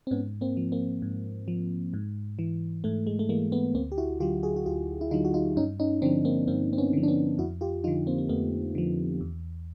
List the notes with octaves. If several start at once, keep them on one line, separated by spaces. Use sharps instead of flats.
C4
G#2 B3 C#4
A#3 C4
F3
A#3 C4
G#2
F3
G#2
E3
G#2 A3
G#3
A3
E3 G#3 A#3
A3 B3
D2 A#3 C4
G4
E4 F#4
D3 F#3 F4 G4
F#4 G#4
F#4
D2 F4 G4
E4
D3 F#3 D#4 F4
F#4
D#4 F4
G2 C#4 D#4
C#4 D#4
D3 F3 C4 D4
A#3 C4
G2 A#3 C4
C4
B3 C#4
D3 F3
D4
B3 C#4
F2 E4 F#4
F4 G4
D3 F3 D#4 F4
A#3 C4
A#3
F2 A3 B3
D3 F3
E2